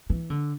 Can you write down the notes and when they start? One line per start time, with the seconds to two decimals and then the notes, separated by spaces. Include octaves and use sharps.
0.10 E3
0.30 D3